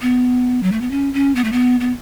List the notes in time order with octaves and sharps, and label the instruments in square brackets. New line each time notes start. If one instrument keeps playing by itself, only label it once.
[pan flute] B3
F#3
A3
B3
C#4
C#4
B3
A3
B3
B3